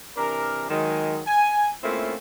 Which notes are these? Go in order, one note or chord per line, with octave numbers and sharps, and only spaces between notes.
C3 E3 D4 A#4
D#3 F#3 G#3
G#5
A3 A#3 C4 C#4 E4 F4